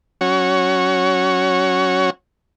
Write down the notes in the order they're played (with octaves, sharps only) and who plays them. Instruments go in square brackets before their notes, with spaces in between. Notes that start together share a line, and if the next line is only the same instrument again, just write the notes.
[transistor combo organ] F#3 C#4 F#4 C#5